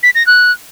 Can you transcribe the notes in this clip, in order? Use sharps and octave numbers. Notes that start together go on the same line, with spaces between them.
B6
A#6
F#6